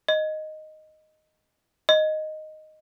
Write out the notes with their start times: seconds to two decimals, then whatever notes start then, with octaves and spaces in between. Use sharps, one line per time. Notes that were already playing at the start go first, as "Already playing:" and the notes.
0.09 D#5
1.89 D#5